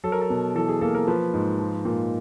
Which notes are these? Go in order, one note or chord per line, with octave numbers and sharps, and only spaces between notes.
F#3 A4
A#4
A4
B2
E3 A4
G#4
A#3 A4
A#4
F3 B4
G#2
F3
A#2